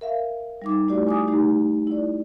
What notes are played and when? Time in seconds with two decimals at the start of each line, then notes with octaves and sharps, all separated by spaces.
0.01 A#4 E5 F5
0.62 G3 D#4 D6
0.88 A3 E4 F#4 G4 D5
1.07 G#5 D6 D#6
1.28 A3 D#4 G4
1.87 E4 D5